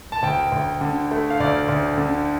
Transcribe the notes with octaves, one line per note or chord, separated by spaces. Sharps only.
A5
D2 G5
D2
D3
A3
F5
D2 D5
D2
D3